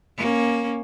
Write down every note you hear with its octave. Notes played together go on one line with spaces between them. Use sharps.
A#3 C#4